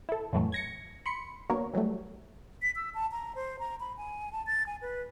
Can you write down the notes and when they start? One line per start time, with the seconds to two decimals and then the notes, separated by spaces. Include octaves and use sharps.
0.09 E4 A4
0.33 F2 A2 E3 F#3 A3
0.52 G#6 A#6 C#7
1.06 B5 C6 C#7
1.50 D3 F#3 A#3 B3 A#4 C#5
1.73 E3 F#3 G3 A3
2.62 B6
2.76 E6
2.94 A5
3.12 A#5
3.35 C5
3.59 A#5
3.80 B5
3.97 G#5
4.32 A5
4.47 A6
4.67 G#5
4.82 B4